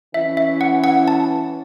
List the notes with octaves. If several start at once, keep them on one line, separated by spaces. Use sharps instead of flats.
E3 C#4 E4 E5
E5
F#5
F#5
A5